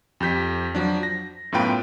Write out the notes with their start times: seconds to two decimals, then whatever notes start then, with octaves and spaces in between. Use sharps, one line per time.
0.20 F2 G4 G6 B6
0.75 F3 F#3 D4
1.03 A#6
1.52 F#2 A2 B3 F4 B4 G5